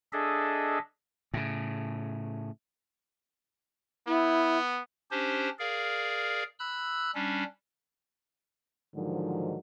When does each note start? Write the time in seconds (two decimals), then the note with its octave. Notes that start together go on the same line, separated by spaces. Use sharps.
0.13 D4 G#4 A4 D#5 E5
1.34 A2 C#3
4.07 B3 E4
5.11 C#4 D4 G4 C5
5.59 G#4 A#4 D5 F5
6.59 B5 E6 F#6
7.14 G3 C#4 D4
8.95 G#2 D3 D#3 F3 F#3